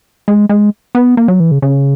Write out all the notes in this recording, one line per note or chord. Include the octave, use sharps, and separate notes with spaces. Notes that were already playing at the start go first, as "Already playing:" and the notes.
G#3
G#3
B3
A#3
F#3
E3
C#3
C#3